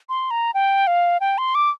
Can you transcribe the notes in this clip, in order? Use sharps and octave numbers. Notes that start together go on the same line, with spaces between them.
C6
A#5
G5
F5
G5
C6
D6